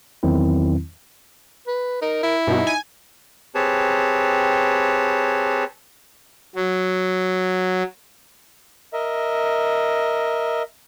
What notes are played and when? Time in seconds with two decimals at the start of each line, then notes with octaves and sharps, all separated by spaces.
0.23 E2 D#3 F#3 C4 E4
1.67 B4
2.02 D#4 A#4
2.23 E4
2.47 G2 B2 D#4
2.67 G#5
3.55 C4 G4 G#4 B4 C#5 A5
6.56 F#3
8.93 A#4 D#5 E5